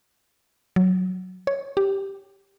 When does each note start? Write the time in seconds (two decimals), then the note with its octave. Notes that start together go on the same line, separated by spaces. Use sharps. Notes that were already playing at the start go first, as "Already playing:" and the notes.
0.76 F#3
1.47 C#5
1.77 G4